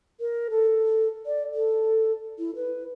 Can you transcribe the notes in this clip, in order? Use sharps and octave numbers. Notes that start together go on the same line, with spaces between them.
A#4
A4
D5
A4
E4
B4